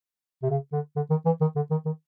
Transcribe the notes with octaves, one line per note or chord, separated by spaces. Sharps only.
C3
C#3
D3
D3
D#3
E3
D#3
D3
D#3
D#3